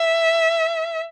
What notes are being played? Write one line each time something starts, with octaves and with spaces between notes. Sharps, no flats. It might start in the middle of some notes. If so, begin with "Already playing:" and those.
Already playing: E5